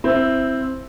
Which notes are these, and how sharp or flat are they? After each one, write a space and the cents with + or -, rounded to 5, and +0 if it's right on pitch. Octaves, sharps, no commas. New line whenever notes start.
C4 +0 E4 +0